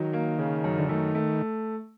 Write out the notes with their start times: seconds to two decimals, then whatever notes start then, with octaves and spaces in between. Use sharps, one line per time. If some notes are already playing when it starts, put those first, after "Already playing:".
Already playing: D#3 F#3
0.13 A#3
0.38 C#3
0.64 F#2
0.78 D3
0.89 D#3 A3
1.15 A3